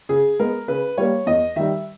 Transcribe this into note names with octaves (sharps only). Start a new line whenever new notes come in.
C#3 G#4
G#3 B3 A#4
C#3 B4
G3 A#3 C#5
E2 D#5
D#3 G3 E5